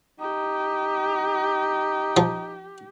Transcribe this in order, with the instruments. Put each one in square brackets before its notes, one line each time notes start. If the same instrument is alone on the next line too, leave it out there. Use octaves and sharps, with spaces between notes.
[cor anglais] D#4 [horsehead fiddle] G4
[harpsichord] F3